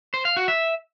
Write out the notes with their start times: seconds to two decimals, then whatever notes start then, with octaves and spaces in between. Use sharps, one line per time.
0.14 C5
0.25 F5
0.37 F#4
0.48 E5